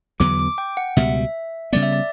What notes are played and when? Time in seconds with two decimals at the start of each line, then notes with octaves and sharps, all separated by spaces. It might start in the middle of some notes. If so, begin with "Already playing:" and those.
0.20 E2 D3 F#3 B3 D6
0.39 D6
0.58 G5
0.77 F#5
0.97 C#2 B2 G3 E5
1.73 C#3 G3 B3 D5
1.83 E5
1.93 D5